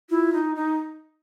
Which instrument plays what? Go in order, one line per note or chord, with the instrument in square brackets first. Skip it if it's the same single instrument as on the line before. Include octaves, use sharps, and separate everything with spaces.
[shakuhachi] E4 [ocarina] F4
[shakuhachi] D#4
D#4